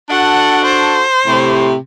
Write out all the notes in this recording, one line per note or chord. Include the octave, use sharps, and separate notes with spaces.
D4 F#4 A4 F#5
C5
A2 C3